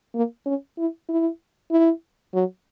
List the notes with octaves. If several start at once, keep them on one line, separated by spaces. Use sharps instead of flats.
A#3
C#4
E4
E4
E4
F#3